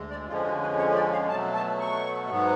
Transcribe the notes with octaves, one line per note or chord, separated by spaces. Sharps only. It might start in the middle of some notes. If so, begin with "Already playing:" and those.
Already playing: D2 G#3
D5
F2 D3 F3 G#3 C#4 F4
F#4
B4
C#5
D5
F5
B2 F#3 A3 A5
A5
C#6
G#2 F#3 B3